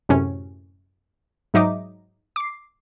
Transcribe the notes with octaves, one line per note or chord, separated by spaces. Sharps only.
F#2 A2 C3 C#4
G#2 F#3 D#4 D#5 E5 D6
D6 C7